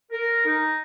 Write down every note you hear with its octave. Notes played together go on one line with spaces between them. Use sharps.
A#4
D#4